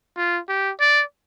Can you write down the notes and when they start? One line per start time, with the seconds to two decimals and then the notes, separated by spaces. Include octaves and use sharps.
0.17 F4
0.49 G4
0.80 D5